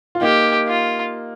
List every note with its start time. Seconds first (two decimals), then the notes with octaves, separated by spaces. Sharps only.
0.15 F4
0.21 A#3 D#4 G4
0.68 F4